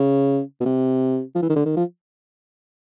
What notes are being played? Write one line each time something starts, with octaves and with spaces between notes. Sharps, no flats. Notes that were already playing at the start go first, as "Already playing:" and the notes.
Already playing: C#3
B2
C3
F3
E3
D#3
D3
D#3
F3